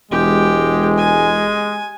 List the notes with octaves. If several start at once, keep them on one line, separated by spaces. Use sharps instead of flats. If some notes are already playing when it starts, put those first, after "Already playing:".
E1 G#3 G4
G#5